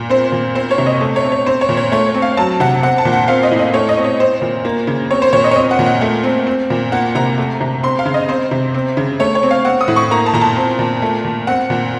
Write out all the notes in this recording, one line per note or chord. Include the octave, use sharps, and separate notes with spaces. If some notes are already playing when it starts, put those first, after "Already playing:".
Already playing: A#2
C4 C5
A#2
C4 C5
C#5
C3
D#5
A3
C#5
C4
C#5
C4 C5
C#5
A#2
C#5
A3 C#5
C4
F5
F#3 A5
C3 F#5
C4 F#5
A5
A#2
F#5
C4 F5
D#5
A2
D#5
A3 C#5
D#5
C4
C#5
C4 C5
A#2
A#3
C#3
C4 C#5
C5
A#2 C#5
D#5
C#5
C4 D#5
F#5
A#2
F#5
A3
C4
C4
A#2
A#3 F#5
C3 A#5
A3
C3
C4 C6
F5
C#3
D#5
C4 C5
C3
C4
C#3
A3 C#5
C#5
C4
F5
C4 F#5
D#6
A2
C#6
A#3 A#5
A5
A#2 A#5
A5
C4
A#2
A3
A#2
C4 F#5
A#2